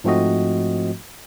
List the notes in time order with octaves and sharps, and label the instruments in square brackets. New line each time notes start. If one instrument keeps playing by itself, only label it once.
[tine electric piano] G#2 F3 A3 C4 F#4 D#5